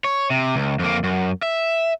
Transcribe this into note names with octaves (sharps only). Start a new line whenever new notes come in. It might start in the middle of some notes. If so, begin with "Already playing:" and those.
C#5
C3
C#2
F2 A#3
F#2
E5